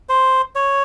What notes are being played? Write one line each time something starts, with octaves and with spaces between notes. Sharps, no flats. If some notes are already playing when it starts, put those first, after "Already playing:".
C5
C#5